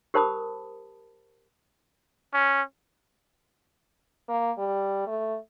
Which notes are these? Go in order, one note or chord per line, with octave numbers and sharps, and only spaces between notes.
G4 A#4 C5 A5 B5 D#6
C#4
A#3
G3
A3